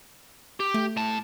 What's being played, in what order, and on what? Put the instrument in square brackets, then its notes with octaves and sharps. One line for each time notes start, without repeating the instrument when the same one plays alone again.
[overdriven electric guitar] G4
[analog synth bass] A3
[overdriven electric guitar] A2 A5